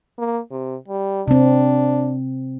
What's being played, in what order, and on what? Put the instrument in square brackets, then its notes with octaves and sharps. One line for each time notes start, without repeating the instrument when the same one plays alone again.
[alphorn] A#3
C3
G3
[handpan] C3 C4 [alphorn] D4